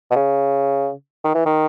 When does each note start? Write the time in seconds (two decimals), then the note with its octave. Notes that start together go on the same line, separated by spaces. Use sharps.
0.11 B2
0.16 C#3
1.24 D#3
1.35 E3
1.46 D#3